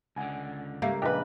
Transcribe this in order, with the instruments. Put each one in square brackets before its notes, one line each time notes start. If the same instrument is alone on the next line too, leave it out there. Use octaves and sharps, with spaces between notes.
[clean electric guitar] C#2 D3 [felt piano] F#5 G#5
[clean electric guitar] C#2 [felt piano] G3 [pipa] A3 [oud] A#3
[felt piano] A#1 D#5 F#6 [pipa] G4 B4